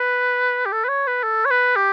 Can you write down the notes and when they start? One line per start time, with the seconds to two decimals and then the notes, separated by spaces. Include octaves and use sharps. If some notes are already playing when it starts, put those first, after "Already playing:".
Already playing: B4
0.66 G4
0.72 A4
0.85 B4
0.89 C#5
1.07 B4
1.24 A4
1.45 C#5
1.51 B4
1.76 G4